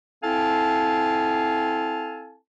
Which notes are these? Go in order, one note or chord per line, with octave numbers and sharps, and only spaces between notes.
C4 E4 A4 F5 G#5 A5